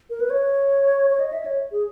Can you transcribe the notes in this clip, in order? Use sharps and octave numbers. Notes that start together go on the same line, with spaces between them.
A#4
B4
C#5
C#5
D#5
E5
C#5
G#4